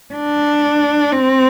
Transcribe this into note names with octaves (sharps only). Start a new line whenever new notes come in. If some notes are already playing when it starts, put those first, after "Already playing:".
D4
C4